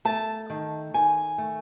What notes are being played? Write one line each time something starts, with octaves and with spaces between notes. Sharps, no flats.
A3 A5
D#3
D#3 G#5
A3